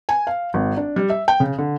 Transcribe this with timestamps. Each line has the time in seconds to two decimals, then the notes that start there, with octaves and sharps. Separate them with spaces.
0.09 G#5
0.27 F5
0.54 G#1
0.77 D4
0.96 G3
1.10 E5
1.28 G5
1.40 C#3
1.58 D3